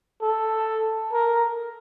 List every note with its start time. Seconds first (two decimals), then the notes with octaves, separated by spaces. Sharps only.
0.22 A4
1.12 A#4